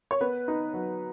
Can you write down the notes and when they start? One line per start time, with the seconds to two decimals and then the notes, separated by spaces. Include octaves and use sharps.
0.11 C#5
0.21 B3 B4
0.48 D#4
0.74 F#3